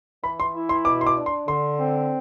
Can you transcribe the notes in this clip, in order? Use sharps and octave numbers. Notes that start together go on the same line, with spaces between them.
E3 B5
C6
E4
C6
B2 D6
C6
D6
D4
C6
D3 C6
C4